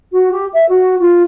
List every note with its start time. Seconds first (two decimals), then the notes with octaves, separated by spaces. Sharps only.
0.12 F#4
0.32 G4
0.53 E5
0.69 F#4
1.00 F4